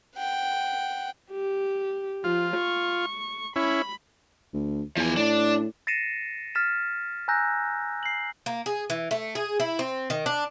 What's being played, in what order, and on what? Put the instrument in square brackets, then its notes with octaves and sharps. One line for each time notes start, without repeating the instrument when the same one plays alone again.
[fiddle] F#5 G5
[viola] G4
[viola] F3 [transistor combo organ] F4
[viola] C#6
[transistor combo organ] C#4 E4 [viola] B5
[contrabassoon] D2
[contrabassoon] E2 [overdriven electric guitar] F3 G#5
[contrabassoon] A2 [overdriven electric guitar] D4
[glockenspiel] A6 A#6 C7 C#7 D#7 E7
F6 A6 B6 E7
G#5 A#5 E6 F#6 G6 A#6
C7 F#7
[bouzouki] A#3
G#4
E3
A3
G#4
E4
C4
D#3
D4